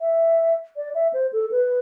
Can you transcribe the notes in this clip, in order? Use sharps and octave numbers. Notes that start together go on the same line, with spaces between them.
E5
D5
E5
C5
A4
B4